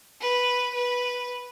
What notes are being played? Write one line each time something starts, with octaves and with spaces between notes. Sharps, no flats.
B4
B4